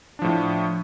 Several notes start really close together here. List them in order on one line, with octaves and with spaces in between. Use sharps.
D4 F3 A2